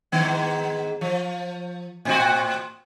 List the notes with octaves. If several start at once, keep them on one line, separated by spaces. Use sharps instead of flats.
G#2 D#3 B3
F3
A2 C4 F#4